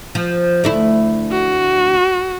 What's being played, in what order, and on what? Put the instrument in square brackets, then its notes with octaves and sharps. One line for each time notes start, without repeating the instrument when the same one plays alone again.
[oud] F3
D2 A3 E4
[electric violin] F#4